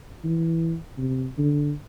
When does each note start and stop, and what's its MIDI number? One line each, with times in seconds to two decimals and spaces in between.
0.24 0.75 52
0.98 1.26 48
1.38 1.72 50